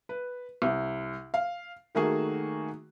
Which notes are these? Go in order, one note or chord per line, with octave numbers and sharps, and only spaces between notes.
B4
C2
F5
D#3 A3 A#3 F#4 G#4